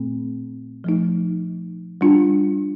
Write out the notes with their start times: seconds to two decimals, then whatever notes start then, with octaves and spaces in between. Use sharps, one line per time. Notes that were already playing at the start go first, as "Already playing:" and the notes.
Already playing: A#2 A3 C4
0.84 F3 A3 D#4
2.01 G3 D4 F4